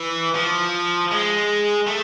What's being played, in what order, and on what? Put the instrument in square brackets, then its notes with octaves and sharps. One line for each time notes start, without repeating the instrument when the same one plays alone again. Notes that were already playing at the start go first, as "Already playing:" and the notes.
Already playing: [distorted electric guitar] E3
F3
G#3
A3